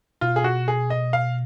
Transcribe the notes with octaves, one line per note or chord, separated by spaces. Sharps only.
B2 F4
G#4
F#4
G#4
D#5
F5